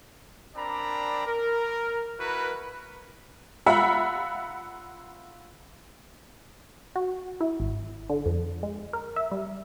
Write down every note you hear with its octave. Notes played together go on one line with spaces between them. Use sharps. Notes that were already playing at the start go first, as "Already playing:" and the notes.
C4 D4 A#4 D5 A#5 B5
A#4
E4 F#4 A#4 B4
F4 E5 F#5 A#5 B5
F#4
E4
G#1
D3
F2
G#3
A#4
E5
G3